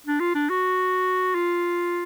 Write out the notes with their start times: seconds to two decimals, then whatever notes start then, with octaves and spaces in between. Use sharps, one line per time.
0.06 D4
0.20 F4
0.35 D4
0.50 F#4
1.35 F4